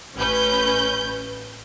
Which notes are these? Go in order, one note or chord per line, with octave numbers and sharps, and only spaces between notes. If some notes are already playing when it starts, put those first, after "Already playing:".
A1 C#4 B4 G6